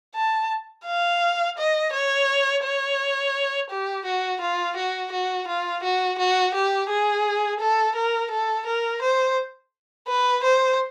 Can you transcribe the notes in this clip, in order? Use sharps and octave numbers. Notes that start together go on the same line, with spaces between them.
A5
F5
D#5
C#5
C#5
G4
F#4
F4
F#4
F#4
F4
F#4
F#4
G4
G#4
A4
A#4
A4
A#4
C5
B4
C5